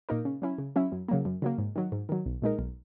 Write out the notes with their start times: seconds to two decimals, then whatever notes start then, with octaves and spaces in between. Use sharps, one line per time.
0.09 A#2 A#3 D#4 A#4
0.25 C#3
0.42 F#3 C#4 E4
0.58 C#3
0.76 F#3 C#4 E4
0.92 F#2
1.08 C#3 F#3 A#3
1.25 F#2
1.42 C#3 F#3 A#3
1.58 G#2
1.76 D#3 F#3
1.92 G#2
2.09 D#3 F#3
2.26 B1
2.42 A#2 G#3 D#4 A#4
2.59 B1